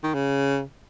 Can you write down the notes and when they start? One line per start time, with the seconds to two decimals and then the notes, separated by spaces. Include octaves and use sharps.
0.03 D#3
0.14 C#3